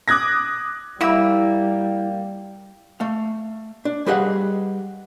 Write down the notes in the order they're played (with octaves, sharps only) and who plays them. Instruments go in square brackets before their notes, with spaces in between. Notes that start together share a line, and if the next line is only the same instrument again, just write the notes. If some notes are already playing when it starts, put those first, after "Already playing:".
[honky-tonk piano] D6 D#6 F#6 G#6 A#6
[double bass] G3 [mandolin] A#3 E6 [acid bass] E4
[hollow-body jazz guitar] A3 F5
D4
G3 G#4 B4 D#5 F5 F#5